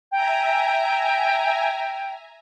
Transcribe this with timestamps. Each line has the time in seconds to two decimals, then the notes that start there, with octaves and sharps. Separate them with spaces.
0.11 E5 G5 G#5 A#5